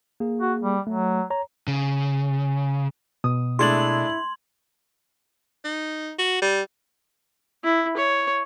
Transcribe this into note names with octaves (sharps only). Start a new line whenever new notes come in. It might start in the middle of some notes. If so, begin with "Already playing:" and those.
A#3 G#4
F#4
G3
F#3 A3
C#5 A#5
C#3
B2 D#6
G#3 A3 D4 E4 C6 G#6 F#7
D#4
F#4
G3
E4
C#5